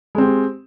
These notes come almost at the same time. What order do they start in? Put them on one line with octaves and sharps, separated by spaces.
G#3 C4 G4